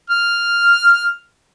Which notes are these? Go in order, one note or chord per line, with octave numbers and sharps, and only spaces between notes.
F6